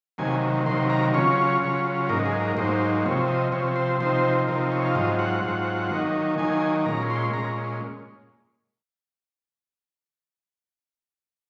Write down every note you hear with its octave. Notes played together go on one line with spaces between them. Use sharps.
C3 D#3 F#3 A#3 G#5
C3 D#3 F#3 A#3 C6
A#5
C#3 F#3 C#4 F4 C#5
C#3 F#3 C#4 F4
G#2 F#3 A#3 D#4 A#4
G#4
A#4
G#2 F#3 A#3 D#4 C5
C3 F3 C4 C#5
D#5
C3 F3 C4 C#5
C5
C3 F3 C4 D#4 C5
C3 F3 C4 D#4 A#4
C#5
F5
G#2 F#3 C4 F4 D#5
F#5
G#2 F#3 C4 F4
D#3 F#3 A#3 D#4
D#3 F#3 A#3 D#4 G#5
A#2 G#3 C#4 A#5
C6
A#2 G#3 C#4 A#5